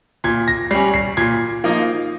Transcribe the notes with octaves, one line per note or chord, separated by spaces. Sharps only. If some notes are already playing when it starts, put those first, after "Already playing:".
A#2 G#6
A#6
G3 C#4 C7
C7
A#2 G#6
F3 A#3 D#4